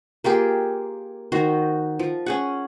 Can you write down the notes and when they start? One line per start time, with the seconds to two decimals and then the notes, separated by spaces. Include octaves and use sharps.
0.24 A#3 F4 G4 G#4
1.32 D#3 F#4 C5 D#5
1.99 F3
2.26 C#4 G#4 F#5